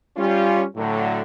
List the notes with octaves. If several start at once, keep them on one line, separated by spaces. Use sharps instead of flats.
G3 C#4 F4
A2 D3 F#3